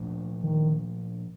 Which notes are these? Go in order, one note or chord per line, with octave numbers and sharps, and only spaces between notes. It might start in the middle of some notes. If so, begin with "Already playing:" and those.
Already playing: A#2 F3 A3 D4
D#3